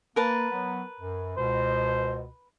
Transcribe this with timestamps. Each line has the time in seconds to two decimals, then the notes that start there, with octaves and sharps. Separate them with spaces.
0.16 A#3 A#4 B4 A5
0.51 F#3 B3
1.01 F#2
1.37 C#2 B2 C5